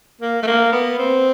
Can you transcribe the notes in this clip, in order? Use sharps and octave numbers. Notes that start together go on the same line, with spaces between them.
A#3
A3
A#3
B3
C4